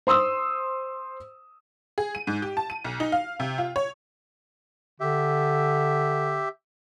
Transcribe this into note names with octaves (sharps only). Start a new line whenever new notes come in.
C5 C6 D#6 E6
G#4
D#7
G#2
G4
A5
D#7
B1
D#4
F5
C3
F4
C#5
D3 G4 E5